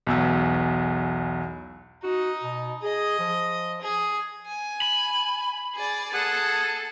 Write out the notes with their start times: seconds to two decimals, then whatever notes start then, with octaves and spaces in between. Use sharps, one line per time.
0.07 B1 E2 E6
2.03 D#4 F#4
2.43 B2
2.83 G#4 D#5
3.19 F3
3.81 G#4
4.47 G#5
4.82 B5
5.75 G#4 D5
6.13 G#4 A4 F#5